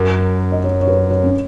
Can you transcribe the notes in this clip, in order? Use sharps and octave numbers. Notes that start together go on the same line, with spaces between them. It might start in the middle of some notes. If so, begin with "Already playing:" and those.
Already playing: F#2 A#4
D#5
C#5
C#5
B4
C#5
C#4